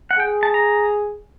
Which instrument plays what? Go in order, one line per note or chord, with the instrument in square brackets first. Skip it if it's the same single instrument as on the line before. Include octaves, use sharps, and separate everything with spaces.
[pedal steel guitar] F#5
[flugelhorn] G#4 [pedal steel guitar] G5
[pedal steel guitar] A5
A#5